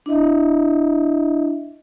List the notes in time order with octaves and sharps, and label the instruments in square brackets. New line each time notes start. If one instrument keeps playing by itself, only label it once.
[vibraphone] D4 E4 D#5 E5